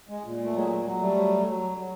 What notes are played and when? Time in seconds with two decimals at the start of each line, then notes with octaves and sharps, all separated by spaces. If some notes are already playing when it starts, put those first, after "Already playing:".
0.09 G#3
0.24 A#2
0.44 A3
0.54 F#3 G#3
0.85 F#3
1.00 G3 A3
1.16 F#3
1.46 F#3
1.78 F#3